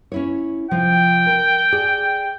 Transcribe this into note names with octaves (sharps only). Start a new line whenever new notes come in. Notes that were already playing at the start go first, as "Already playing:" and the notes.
C#4 E4 C#5
C3 F3 G5
A#4
G#4 D5